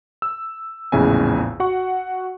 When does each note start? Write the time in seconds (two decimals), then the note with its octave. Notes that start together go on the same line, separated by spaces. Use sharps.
0.22 E6
0.92 A#1 E2 A2 C#3 E4 G#5
1.60 F#4 F#5 C#6